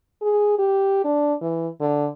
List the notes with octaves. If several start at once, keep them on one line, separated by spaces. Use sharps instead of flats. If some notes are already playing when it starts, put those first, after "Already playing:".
G#4
G4
D4
E3
D3